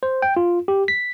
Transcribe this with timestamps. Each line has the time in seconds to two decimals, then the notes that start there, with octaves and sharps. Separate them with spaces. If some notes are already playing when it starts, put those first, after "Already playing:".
0.03 C5
0.22 G5
0.37 F4
0.68 G4
0.88 B6